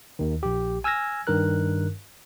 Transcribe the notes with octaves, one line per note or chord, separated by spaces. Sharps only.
D#2 D#3
A#1 G4
G#5 E6 F6 G#6 A#6
G2 D#3 A#4 F#6